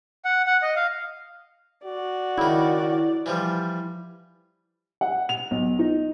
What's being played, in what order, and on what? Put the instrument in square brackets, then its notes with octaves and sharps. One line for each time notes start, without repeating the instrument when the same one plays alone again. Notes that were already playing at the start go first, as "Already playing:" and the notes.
[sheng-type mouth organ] F#5
F#5
D#5
F5
[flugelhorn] F#4 [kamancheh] D5
[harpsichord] C#2 D#3 [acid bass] E4
[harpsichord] E3 F3 G3
[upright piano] F#5
F7
B1
D#4